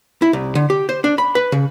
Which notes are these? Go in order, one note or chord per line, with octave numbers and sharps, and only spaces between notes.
E4
C2
D3
G4
C5
D4
B5
B4
C#3